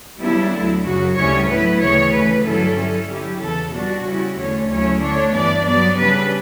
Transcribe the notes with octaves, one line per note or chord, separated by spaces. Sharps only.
C#3 G3 B3 D4 E4
D2 D3 F#3
F#2 C#3 F#3 F#4
D2 C#3 G3 C#4 E4 C#5
A2 F#3 B3 E4 B4
D2 C#3 E3 C#5
C#3 E3 A3 B4
G2 D3 F#3 C#4 E4 A4
D3 F#3 C#4 E4
D3 F#3 C#4 E4 G4
E2 C#3 E3 A4
B2 G3 D4 F#4
C#3 G3 C#4 E4
E2 D3 A3 C#4 C#5
D2 C#3 F#3 C#4 E4 C#5
D3 A3 D4 C#5
G2 E3 B3 D4 D5
G2 F#3 B3 D5
C#3 G3 D4 B4